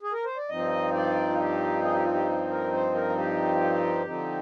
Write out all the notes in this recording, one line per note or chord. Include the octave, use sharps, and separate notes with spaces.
G#4
A#4
C5
D5
G2 F3 C4 D#4 D#5
D5
F4
G4
G#4
G4
F4
G4
A#4
C5
A#4
G4
D3 F3 C4 D#4